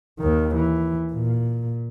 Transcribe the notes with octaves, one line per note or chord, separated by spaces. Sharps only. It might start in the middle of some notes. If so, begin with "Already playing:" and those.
D#2 D#3
E3
A#2